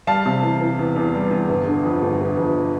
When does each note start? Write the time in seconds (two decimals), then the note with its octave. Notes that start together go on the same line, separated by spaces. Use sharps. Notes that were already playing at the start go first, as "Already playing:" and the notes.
0.07 G3 F5 A5
0.26 C3
0.43 E3
0.61 E3
0.79 E2
0.96 E2
1.14 G3
1.31 E2
1.49 G1
1.67 D3
1.85 F2
2.02 G1
2.21 G1
2.38 F2